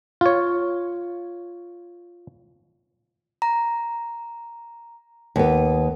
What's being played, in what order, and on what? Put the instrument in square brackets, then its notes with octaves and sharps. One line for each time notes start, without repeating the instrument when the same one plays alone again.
[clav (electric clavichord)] F4 C#5
[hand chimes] A#5
[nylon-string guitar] D#2 B3